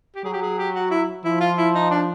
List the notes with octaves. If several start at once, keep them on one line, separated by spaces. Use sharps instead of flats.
G4
F#3 G#4
G4
G#4
G4
F#4
E4
F3 E4
F4
E4
D#4
D4